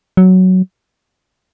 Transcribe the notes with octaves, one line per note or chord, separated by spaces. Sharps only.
F#3